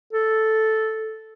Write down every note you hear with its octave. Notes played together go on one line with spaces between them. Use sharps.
A4